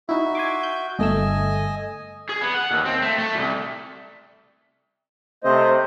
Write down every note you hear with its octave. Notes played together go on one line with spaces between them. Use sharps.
D#4 E4 F#4 E5
G#5 C6 D6
G6
G1 A3 D#5 G#5 E6
G#4
B3
F#5
D#2
C4
A3
A3
C2
C3 A3 C5 D#5